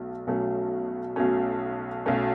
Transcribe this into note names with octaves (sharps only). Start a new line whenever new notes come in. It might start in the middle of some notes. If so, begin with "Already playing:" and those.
Already playing: B1 F#3 A3
B1 B2 F#3 A3 C#4
B1 B2 F#3 A3 C#4
B1 B2 F#3 A3 C#4